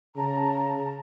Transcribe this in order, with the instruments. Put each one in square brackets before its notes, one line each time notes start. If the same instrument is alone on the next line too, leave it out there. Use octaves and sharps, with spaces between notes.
[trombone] C#3 [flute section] A5 A#5